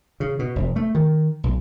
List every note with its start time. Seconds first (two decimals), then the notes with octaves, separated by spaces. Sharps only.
0.20 C#3
0.39 B2
0.56 F1
0.76 A3
0.95 D#3
1.44 B1